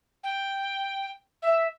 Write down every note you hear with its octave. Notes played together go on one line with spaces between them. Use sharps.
G5
E5